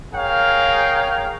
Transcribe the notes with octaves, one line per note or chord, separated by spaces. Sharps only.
G#4 A#4 C#5 F5 G5